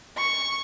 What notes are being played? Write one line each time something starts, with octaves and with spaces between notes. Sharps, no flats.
C#6